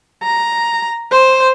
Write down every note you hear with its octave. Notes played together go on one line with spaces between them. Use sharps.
A#5
C5